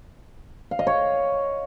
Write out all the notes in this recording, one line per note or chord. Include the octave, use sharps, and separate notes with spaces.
F5
D#5
C#5